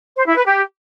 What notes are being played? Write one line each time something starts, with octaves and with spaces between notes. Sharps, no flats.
C5
E4
B4
G4